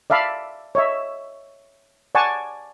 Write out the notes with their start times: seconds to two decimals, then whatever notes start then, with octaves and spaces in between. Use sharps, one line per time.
0.10 D5 E5 F5 A5 B5
0.75 C#5 D#5 E5
2.15 D5 F#5 G#5 A5 C#6